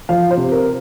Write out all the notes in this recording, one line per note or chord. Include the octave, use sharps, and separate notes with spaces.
F3 F5
C5
C3
A#4